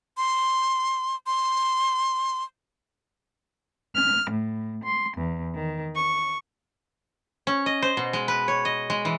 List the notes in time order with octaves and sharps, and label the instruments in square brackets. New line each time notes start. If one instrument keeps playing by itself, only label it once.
[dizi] C6
C6
[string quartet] F6
A2
C6
E2
D#3
C#6
[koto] C#4
D#5
C5
B2
G#3
B4
C#5
D#5
G#3
E3